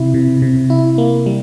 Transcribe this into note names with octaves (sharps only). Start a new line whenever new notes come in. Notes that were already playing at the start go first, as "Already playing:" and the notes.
Already playing: C3 E4
C3
C3
E4
A#3
G3